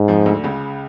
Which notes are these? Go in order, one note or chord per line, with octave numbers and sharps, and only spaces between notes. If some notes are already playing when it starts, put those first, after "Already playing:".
Already playing: G#2
F2 F3
D2 D3
C#2 C#3